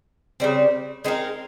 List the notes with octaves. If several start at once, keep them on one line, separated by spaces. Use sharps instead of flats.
C#3 G3 C4
G#3 C4 D#4 A#4